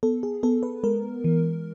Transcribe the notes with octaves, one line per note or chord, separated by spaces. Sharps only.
B3 A4
G#4
B3 A4
B4
G#3 A#4
E3